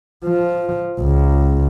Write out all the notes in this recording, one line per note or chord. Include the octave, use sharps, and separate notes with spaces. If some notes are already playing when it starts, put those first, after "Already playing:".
F3
C#2